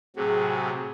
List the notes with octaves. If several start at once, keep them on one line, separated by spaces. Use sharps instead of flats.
A2 C3 F#3 G#4